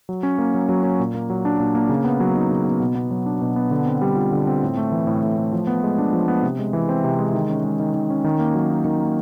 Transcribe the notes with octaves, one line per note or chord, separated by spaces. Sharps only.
F#3
C#4
A#3
F#3
F#3
C#4
A#2
A#3
F#3
D4
A#2
A#3
C#3
B3
F#3
D#4
C#3
B3
B2
B3
F#3
D4
B2
B3
D3
C4
G3
F4
D3
C4
A2
A3
E3
A2
A2
A3
F3
B3
G#3
D4
F3
B3
C3
G#3
E3
C4
C3
G#3
D#3
C#4
G#3
D#3
D#3
C#4
D#3
A#3
F#3
D#4
D#3
A#3